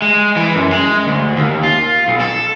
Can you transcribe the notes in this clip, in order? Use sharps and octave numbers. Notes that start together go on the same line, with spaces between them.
G#3
E3
F#2
G#3
D2
D#2
F4
B1
A4